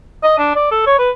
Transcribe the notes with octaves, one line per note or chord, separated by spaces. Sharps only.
D#5
D4
D5
A4
C#5
B4